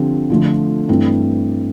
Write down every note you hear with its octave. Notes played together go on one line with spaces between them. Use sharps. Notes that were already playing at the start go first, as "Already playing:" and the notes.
Already playing: D3 F3 C4 G4
D3 F3 A3
G2 E3 A3 C4 E4